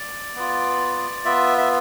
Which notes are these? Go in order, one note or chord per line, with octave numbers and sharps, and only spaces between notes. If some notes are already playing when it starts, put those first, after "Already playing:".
Already playing: D5
B3 F4
B3 F4 E5
E5